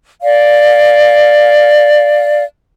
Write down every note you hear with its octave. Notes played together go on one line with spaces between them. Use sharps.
D5 F5